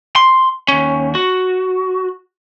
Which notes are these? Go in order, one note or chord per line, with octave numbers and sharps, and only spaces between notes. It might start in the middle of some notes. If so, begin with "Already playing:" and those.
C6
D#2 C#4
F#4